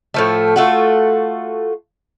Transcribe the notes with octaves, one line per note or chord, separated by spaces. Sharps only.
A2 F3 A3
A3 F4 F#4